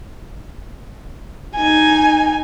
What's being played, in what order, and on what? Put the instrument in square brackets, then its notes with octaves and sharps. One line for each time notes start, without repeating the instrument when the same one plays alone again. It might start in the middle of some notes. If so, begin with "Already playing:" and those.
[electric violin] D#4 G#5